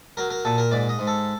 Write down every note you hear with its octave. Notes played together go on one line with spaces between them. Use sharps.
F#3 A#4
A#4
A#2 A4
A#4
G#2 D5
D#5
G#2
A4